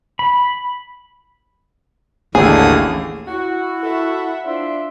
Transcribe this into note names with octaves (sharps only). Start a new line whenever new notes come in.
B5
A1 D#2 A2 D3 A#3 G#4 D#6
E4 F#4
F#4 A4 E5 F#5
D4 F4 C5 E5